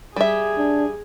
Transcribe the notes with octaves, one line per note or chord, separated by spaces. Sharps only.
G3 G#4 E5
D4